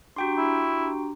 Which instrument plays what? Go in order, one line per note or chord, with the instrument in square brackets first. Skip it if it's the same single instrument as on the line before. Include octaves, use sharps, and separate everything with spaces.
[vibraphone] D4 G4 A#5 [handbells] F#4 G5 C6
[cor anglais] E4